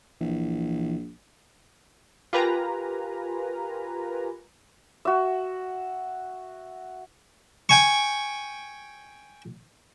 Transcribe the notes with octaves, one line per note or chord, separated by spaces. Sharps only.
A#1 E3
F4 G4 A#4 B4 G#5 A#5
F#4 E5
G5 G#5 C#6